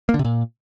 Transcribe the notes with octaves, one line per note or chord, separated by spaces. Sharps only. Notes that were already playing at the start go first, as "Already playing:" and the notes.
A#3
D3
C3
A#2